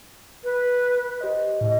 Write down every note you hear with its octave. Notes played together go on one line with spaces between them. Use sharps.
B4
G4 C5 D#5
A2 D#5